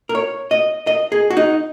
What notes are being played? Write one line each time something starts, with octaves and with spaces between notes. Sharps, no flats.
A#4
C#5
D#5
D#5
G#4
F#4
D#4